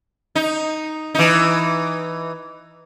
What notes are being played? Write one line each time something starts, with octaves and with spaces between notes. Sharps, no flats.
D#4
E3 D#4